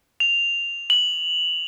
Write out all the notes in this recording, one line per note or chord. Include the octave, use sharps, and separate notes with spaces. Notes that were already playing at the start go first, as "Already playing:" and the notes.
F7
F#7